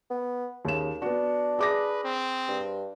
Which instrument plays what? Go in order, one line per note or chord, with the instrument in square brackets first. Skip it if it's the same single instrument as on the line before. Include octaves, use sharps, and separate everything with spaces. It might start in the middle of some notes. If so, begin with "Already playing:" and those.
[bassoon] B3
[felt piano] D#2 E7 [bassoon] C#3
[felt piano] B3 F#4 [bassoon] D4
[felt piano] G#4 D6 A#6 [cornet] B4
[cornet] C4
[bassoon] G2